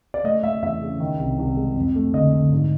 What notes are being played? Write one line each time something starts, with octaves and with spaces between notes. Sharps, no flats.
D5
A3 D#5
A3 E5
E2 E5
C#3
D#3
C2
C2
G#3
F2
A3
D3 D#5
D3
G#2